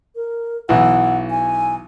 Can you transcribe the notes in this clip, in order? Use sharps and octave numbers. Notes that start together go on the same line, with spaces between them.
A#4
B1 E3 F#5
G#5